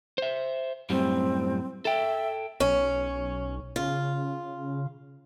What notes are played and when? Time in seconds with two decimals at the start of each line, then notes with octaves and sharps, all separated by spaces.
0.18 C5 E5
0.90 F#2 A2 G3 C4
1.85 A4 E5 G5
2.60 B1 C#4
3.76 C#3 F4